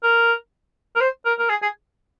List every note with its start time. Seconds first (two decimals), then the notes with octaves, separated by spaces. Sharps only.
0.03 A#4
0.96 A#4
1.01 C5
1.26 A#4
1.39 A#4
1.50 G#4
1.62 G#4